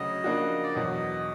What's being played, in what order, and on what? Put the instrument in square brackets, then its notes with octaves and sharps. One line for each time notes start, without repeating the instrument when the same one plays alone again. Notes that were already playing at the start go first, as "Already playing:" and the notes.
Already playing: [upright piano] D2 C#3 F#3 [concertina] D#5
[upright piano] C#3 F3 A#3 D4 F#4
[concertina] D5
[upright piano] E2 B2 F#3 [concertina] D#5